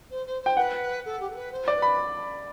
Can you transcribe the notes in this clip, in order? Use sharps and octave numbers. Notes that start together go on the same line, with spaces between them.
C5
C5
C5 G5
B4 F#5
A4
G4
A4
B4
C5
D5
B4
B5